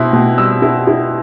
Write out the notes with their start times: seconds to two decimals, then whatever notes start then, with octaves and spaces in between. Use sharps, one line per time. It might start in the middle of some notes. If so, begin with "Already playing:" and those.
Already playing: B2 C4 E4
0.13 B2
0.38 G3 E6
0.62 E4
0.87 E4